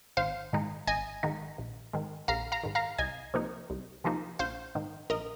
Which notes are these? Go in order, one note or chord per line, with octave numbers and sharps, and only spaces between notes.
G#1 C5 F5
G#2 D#3 G#3 D#4
G#1 D#5 G#5
G#2 D#3 G#3 D#4
A#1
G#2 D#3
A#1 F5 A#5
F5 A#5
G#2 D#3
F5 A#5
C2 D#5 G#5
C3 F3 A#3 D#4
C2
C3 F3 A#3 D#4
A#1 C5 F5
G#2 D#3
A#1 A#4 D#5